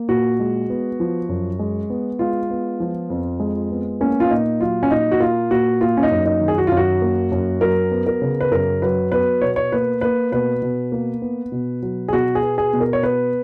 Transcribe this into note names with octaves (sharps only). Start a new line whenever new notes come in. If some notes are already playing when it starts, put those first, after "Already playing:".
Already playing: A#3
A#2 F#4
G#3
B3
F3
F#2
G#3
B3
G#3 F4
B3
F3
F2
G#3
B3
A#3 C#4
F4
A#2 D#4
F#3 F4
C#4
A#2 D#4
F#4
A#3 F4
A#2 F#4
A#3 F4
C#4
D#4
F#2
D#4
D#3
G#4
F#4
F4
F#2
F#4
A#3
F#2
F#3 A#4
B3
A#4
C#3
B4
F#2 A#4
F#3 B4
B3 B4
B2 C#5
C#5
A#3 B4
A#3 B4
B2 B4
B2
A#3
B3
B2
F#3
G#4
B2 F#4
G#4
B3
G#4
B2
A#4
C#5
B3 B4